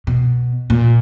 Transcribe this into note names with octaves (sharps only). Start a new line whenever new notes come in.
B2
A#2